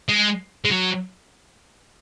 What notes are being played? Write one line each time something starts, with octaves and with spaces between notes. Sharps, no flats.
G#3
G#3
F#3